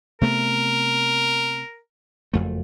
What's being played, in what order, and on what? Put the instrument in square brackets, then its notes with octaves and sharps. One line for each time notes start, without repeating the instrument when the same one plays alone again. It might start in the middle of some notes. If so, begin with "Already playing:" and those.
[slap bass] C3 A3 B3 [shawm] A#4
[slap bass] F#1 F2 A3